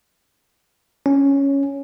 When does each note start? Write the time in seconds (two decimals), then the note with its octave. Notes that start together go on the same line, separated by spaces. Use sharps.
1.06 C#4